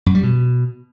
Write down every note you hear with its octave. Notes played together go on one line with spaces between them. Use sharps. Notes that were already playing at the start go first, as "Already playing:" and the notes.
F#2
G3
B2